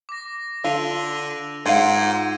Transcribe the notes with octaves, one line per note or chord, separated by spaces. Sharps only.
D6 A#6
D3 F4 E6 D#7 F7
G#2 F4 F5 F#5 G#6 C7 D#7